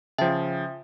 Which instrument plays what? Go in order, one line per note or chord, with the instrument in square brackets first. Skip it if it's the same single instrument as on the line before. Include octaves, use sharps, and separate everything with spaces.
[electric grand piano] C#3 F3 [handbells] E5 G5 A5